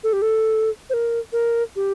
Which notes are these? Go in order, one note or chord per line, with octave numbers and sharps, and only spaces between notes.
A4
G4
A4
C5
A#4
A#4
G4